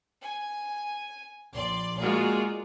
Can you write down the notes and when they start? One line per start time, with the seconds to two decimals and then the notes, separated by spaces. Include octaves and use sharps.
0.23 G#5
1.55 A#1 D5 C6
1.98 G#3 A#3 F4 F#4 G#4 D5